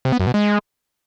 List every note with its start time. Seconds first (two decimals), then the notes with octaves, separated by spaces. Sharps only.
0.05 C3
0.12 B3
0.20 F#2
0.27 B2
0.34 G#3